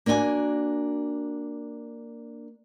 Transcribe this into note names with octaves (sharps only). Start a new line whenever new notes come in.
A#3 D4 F#4 G5 G#5